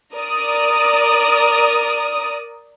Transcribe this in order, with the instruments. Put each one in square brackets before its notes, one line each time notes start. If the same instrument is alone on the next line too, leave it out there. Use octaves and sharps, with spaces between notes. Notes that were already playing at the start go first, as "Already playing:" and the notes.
[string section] A#4 D5 D#6